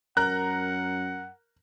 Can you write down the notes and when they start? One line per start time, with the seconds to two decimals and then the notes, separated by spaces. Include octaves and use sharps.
0.17 F#2 A#4 F#5 A#5 F#6